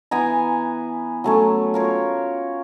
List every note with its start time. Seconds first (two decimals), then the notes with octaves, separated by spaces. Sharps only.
0.11 E3 B3 G#5 A#5
1.24 F#3 A3 C#4
1.74 F4 A#4 C#5